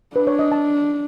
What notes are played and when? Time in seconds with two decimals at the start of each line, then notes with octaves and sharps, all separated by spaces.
0.16 D4 B4
0.27 C#5
0.39 D#5
0.52 A5